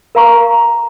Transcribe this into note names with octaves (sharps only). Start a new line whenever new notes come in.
A#4 F5 A#5 C#6